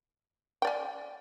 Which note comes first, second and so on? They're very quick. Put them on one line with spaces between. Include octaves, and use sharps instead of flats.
G5 D5 G#5